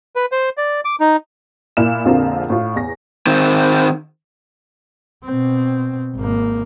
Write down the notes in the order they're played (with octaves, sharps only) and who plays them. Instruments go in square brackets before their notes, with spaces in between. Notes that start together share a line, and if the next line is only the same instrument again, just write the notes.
[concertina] B4
C5
D5
D6
D#4
[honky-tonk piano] A#2 A#3 E4 E5 F6 E7
A#1 F2 D3 C4 F4 A#4
A2 F4
E2 A#6
[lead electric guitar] D#3 C4
[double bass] B2 C4
G#1 A#3